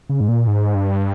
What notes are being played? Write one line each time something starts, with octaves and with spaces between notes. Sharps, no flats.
C#3
G#2
A#2
G#2
G2